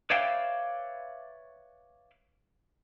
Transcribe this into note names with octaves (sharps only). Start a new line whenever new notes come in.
B4 C#5 D5 E5 F5 G5